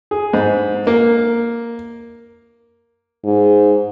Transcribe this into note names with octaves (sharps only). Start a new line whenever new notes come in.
G#4
G#2
A#3
G#2